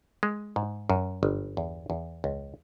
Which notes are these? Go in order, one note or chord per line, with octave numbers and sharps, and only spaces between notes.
G#3
G#2
F#2
G1
E2
E2
C#2